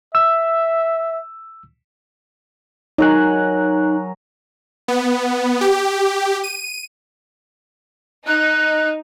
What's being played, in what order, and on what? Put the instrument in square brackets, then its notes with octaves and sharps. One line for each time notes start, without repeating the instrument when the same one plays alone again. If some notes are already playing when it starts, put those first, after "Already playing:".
[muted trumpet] E5 [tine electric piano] E6
[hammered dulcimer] F#3 A#4 G#5 [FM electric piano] D#4 F#6
[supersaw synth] B3
G4
D#7
[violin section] D#4 [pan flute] F#6